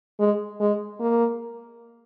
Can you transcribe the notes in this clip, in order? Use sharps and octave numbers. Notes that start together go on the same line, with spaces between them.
G#3
G#3
A#3